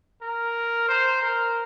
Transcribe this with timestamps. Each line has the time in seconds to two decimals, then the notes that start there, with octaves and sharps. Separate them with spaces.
0.22 A#4
0.89 C5
1.22 A#4